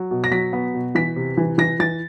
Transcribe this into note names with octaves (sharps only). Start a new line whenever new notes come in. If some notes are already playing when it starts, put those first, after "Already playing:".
Already playing: F#3
B2
A#6
F#3 B6
B3
B2
E3 B6
C3
E3
E3 A#6
E3 A6